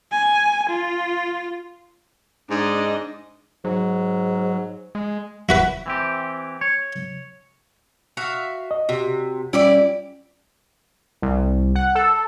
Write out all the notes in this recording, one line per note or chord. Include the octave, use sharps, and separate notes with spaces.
G#5
F4
G#2 D4 D#5
G#2 F#3
G#3
E4 F#4 B4
E3 C4 G4
C#5
F#4 E5 F5
D#5
C3 F#4
G3 C#4 E4 F4 G4 D5
C2
F#5
A4